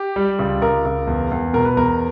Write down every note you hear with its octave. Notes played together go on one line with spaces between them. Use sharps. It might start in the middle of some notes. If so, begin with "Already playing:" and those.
Already playing: G4
G3
C#2
C#2 A#4
C#2
E2
E2
B2 A#4
B4
E2 A#4